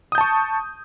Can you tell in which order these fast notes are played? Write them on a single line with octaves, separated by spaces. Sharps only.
D#6 G6 A5 C#6